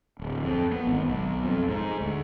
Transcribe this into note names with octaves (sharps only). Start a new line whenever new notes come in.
D1
F2
B3
G#1
B1
F2
G#2
D2